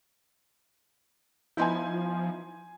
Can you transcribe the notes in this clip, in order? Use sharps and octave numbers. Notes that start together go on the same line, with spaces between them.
F3 B3 D#4 E4 G#5 C6 G6